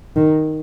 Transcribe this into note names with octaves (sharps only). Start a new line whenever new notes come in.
D#3